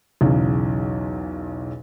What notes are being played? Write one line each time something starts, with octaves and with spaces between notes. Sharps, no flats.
B1 E2 C#3